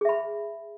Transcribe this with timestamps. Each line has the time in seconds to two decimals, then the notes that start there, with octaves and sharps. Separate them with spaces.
0.01 G#4
0.05 E5
0.09 B5